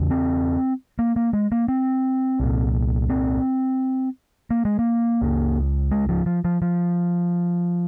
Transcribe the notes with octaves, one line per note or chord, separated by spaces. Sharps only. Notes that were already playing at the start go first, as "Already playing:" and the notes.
Already playing: E2 C#3
C4
A#3
A#3
G#3
A#3
C4
C2 A#2
C4
A#3
G#3
A#3
C#2 C#3
G#3
F3
F3
F3
F3